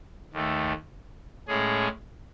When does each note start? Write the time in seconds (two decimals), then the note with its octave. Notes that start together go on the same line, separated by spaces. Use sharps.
0.33 D#2 D#3 A3
1.48 A2 G#3 C#4 G#4